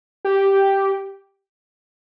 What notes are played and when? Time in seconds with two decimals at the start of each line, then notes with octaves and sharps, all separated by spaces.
0.25 G4